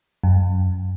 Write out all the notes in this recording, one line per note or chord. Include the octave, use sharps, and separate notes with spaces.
F#2